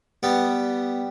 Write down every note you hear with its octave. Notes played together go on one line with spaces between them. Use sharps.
G3 B3